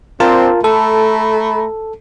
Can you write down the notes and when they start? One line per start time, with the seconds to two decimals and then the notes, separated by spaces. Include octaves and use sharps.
0.20 C4 D4 F4 A#4 A5
0.64 A3 A4 A#5 B5